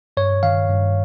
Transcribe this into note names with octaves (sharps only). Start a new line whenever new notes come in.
G2 C#5
D#3 F5
G2